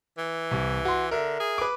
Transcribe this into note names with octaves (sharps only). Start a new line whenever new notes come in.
E3
C2
F#4 C6
D3 A#4 E5
G#4
B4 D6